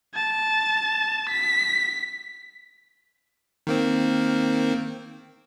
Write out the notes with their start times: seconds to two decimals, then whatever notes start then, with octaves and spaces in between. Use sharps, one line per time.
0.15 A5
1.30 B6
3.67 D#3 A#3 C4